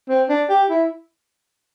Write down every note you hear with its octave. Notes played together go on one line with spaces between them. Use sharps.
C4
D4
G4
E4